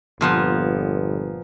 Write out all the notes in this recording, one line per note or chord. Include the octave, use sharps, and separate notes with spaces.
G1 A#2 F3 B3